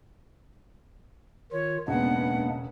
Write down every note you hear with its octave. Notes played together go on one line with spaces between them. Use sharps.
D#3 F4 C#5
E1 C#3 G#3 A#3 B3 D4 F#5